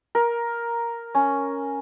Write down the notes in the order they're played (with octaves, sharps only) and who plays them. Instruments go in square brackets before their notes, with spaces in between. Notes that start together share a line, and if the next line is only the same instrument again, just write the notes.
[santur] A#4
C#4